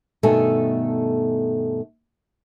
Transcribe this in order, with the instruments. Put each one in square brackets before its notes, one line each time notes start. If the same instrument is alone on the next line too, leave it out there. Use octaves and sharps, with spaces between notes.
[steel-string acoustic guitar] G2 B2 D#3 A3 A4 G#5